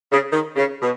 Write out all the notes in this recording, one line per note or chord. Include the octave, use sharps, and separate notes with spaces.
C#3
D#3
C#3
B2